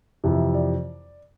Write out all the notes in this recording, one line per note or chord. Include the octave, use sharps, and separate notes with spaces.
F2 C3 E3 E5
D5